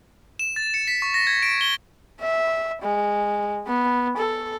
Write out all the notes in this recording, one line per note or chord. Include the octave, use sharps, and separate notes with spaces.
E7
A6
C#7
B6
C#6
A#6
G#6
D7
G7
E5
G#3
B3
A4